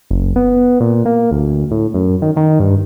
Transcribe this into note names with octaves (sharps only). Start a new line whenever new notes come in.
F#1
B3
A#2
A#3
D2
A2
F#2
D#3
D#3
G2